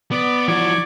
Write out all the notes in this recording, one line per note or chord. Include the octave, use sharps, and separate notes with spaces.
B3 D5
E3 F3 F#4 D5 C#6 G#6